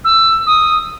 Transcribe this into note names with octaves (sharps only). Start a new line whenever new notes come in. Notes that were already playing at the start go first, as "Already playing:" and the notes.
E6
D#6